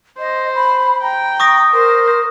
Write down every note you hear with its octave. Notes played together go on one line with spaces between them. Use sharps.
C5 D#5
B5
G5 A#5
C#6 D#6 A#6
A#4 C5